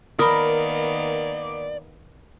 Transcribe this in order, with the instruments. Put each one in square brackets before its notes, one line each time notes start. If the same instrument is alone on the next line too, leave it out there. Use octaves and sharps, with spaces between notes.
[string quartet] D#3 A#3 B3 [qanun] A#4 [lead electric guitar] D5 [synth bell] B5 D#6